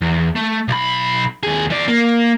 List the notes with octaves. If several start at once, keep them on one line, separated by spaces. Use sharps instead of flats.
E2
A3
B1 B5
D#2 G#4
E3 D5
A#3